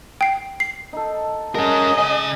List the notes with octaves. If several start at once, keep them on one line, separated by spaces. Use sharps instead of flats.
G5 C7
C7
D#4 A4
G#3 C#4 A#4 D#5 F#5
C#3 G#5